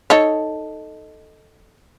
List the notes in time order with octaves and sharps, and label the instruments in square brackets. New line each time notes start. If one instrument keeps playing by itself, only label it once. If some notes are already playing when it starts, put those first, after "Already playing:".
[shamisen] D#4 A4 C#5